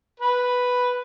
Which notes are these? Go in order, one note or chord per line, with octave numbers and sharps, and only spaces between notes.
B4